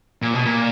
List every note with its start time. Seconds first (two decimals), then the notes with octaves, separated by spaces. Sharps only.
0.22 A#2
0.34 B2
0.45 A#2